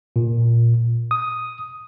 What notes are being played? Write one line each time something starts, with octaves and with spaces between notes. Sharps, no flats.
A#2
D#6